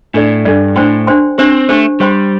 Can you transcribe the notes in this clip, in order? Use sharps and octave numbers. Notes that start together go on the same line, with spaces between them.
A2 D4 A4 D5
G2 D4 A4 D5
A2 D4 C5 G5 C6
D4 C5 G5 C6
C4 D4 G4 C5
A3 D4 G4 C5
G3 G4 C5 G5 C6